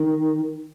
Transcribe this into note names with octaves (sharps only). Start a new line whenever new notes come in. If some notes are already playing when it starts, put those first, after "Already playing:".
Already playing: D#3